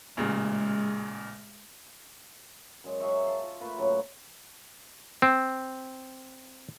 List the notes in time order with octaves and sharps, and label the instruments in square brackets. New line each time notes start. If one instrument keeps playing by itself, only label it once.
[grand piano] A1 A#2 C#3 [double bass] G#3
[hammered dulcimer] F#2 G#3
F#3 G#4 E5 C#6
F5 A5
F4
A3 A#3 F4 B4
A2 C#3 F#3
[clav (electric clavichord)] C4